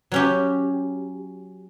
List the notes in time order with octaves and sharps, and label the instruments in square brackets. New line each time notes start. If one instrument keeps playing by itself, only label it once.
[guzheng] F#3 C#4 G4